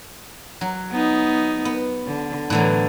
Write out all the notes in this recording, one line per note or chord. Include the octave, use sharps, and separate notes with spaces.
F#3
B3 D#4
B3
D3
A2 D3 E3 F#3